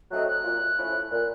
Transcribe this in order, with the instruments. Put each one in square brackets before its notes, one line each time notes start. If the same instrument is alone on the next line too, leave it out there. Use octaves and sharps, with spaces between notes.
[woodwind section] F#3 A3 C4 D#4 [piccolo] F#6
[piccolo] F#6
[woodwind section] A#2
F3 A3 C#4 E4
[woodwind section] A#2 [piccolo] F#6